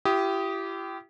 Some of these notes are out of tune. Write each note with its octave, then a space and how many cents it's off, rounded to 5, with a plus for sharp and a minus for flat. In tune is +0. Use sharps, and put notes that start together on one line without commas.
E4 +40 G4 -15 D#6 +5